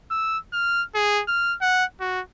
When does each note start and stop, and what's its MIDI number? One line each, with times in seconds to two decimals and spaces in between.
0.11 0.38 88
0.53 0.84 89
0.95 1.23 68
1.28 1.56 89
1.61 1.85 78
2.01 2.21 66